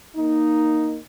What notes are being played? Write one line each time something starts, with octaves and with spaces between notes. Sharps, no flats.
A#3 D#4